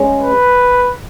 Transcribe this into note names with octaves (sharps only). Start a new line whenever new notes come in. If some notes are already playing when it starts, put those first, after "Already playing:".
Already playing: G#3 C#4
B4